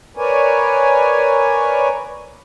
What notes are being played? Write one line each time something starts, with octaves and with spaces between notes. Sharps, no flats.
A#4 B4 C#5 D5 G#5